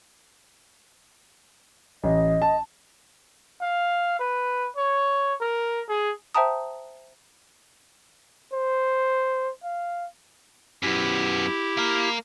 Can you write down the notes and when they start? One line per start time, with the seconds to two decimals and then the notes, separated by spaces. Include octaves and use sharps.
2.04 A1 D#5
2.42 A5
3.61 F5
4.19 B4
4.76 C#5
5.41 A#4
5.89 G#4
6.35 C5 E5 G5 A5 A#5 D#6
8.53 C5
9.63 F5
10.83 F#2 B3 E4 G4
11.77 A#3 A#4